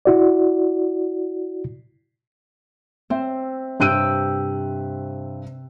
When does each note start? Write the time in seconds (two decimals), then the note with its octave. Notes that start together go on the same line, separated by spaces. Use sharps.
0.05 E4 F#4 D5
3.10 C4 E5
3.80 G2 C3 G5 E6 F#6 D#7